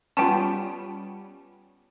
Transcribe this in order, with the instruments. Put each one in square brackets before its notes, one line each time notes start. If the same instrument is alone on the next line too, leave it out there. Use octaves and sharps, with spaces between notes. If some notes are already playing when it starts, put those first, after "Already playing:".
[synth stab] G3 B3 C#4 [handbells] F4 G5 A5